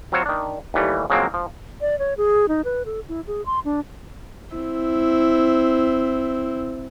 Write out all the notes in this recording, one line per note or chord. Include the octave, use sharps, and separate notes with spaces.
F#3 C4 F4 C5 C#5
D#3 D4
D#2 E3 G3 A3
C#3 F3 F#3 G#3 A#3 C4
F3
D5
C#5
G#4
D#4
B4
A4
E4
G#4
C6
D4
C4 E4